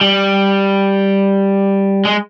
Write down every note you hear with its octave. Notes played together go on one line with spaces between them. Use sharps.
G3
G#3